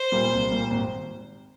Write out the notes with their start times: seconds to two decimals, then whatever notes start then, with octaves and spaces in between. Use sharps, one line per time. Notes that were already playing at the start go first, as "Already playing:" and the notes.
Already playing: C5
0.12 A#2 G3 A#3
0.31 C2
0.51 A#2 G3 A#3
0.70 G#1